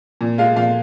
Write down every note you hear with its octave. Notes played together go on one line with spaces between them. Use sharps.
A#2
G#3 F4 F5
A#2 F4 F5